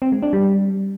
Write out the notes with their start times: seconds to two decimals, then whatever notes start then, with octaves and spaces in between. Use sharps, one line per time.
0.02 C4
0.12 G#3
0.23 D4
0.33 G3